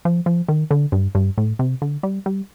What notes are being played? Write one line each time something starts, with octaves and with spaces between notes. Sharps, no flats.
F3
F3
D#3
D3
G2
G2
A2
C3
D3
G3
G3